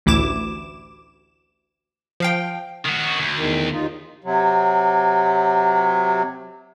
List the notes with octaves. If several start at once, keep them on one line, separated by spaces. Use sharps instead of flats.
A1 D2 E4 D6 E7
F3 F5 G5
D#3 F#4
D2
E2 D#3
D#2 D#4 F4
C3 F#3